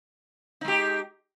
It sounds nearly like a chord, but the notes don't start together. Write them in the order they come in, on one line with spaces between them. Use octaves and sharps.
D#4 G#3 G4